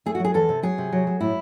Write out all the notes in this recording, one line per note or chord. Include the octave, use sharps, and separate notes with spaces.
A3 G#4
F#4
F#3 G#4
E2 A4
C3
F#3 G#4
C3
F#3
F#3
A2 E4